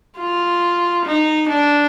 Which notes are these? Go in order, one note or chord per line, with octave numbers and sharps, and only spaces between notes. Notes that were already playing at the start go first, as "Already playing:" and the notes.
F4
D#4
D4